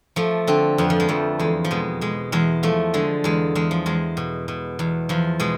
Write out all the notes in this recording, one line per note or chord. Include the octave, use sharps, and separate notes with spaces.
F3 A3
D3 C4
F2 B3
F3
G#3
F2 A3
E2 G#3
F3
B2 G#3
B2 G#3
E2 G#3
F3 A3
D3 G#3
E2 G#3
E2 G#3
F3
E2 G#3
B2
B2
E2
E2 F3
B2 G#3